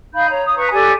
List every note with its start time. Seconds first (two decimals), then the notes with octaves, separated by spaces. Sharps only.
0.14 D#4 F5 B5 G6
0.29 C#5 A#5
0.44 D#6
0.57 B4 A#5 C#6
0.72 G4 A4 D5 G#5